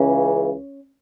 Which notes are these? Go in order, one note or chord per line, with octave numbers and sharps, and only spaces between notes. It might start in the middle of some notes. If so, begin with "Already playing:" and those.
Already playing: C#2 C#3 E3 C#4